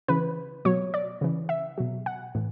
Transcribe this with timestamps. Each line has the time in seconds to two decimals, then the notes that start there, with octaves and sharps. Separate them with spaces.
0.08 C#3 E3 B4
0.65 B2 F#3 C#5
0.94 D5
1.21 C#3 E3
1.49 E5
1.78 B2 F#3
2.06 F#5
2.35 A2 E3